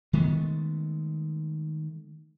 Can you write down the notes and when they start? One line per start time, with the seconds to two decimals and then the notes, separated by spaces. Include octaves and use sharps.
0.13 D#3 G#3 A3 B3